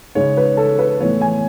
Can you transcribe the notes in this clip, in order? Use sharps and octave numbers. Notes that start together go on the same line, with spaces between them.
C#3 G#3 D#4 C#5
B4
A4
B4
A2 E3 B3 C#5
G#5